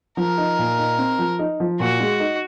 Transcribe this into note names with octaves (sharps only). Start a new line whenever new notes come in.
F3 A#4
D#4
A#2
D#4
C4
F3
D#4
F3
A#2 F#4
G#3
D#4